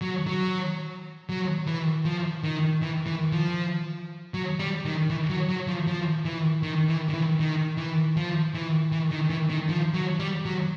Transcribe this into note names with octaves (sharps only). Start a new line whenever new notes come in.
F#3
F#3
F#3
E3
F3
D#3
E3
E3
F3
F#3
G3
D#3
E3
F#3
F#3
F3
F3
E3
D#3
E3
D#3
E3
D#3
E3
F3
E3
E3
D#3
E3
D#3
F3
F#3
G3
F#3